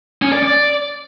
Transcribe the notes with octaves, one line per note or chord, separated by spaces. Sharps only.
C#4
D5
D5